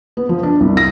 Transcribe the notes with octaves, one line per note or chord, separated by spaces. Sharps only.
B3
F3
D4
C2
A#6